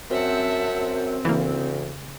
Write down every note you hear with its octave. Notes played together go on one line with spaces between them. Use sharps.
F#2 C4 E5 F#5 A5
D2 C#3 E3 A#3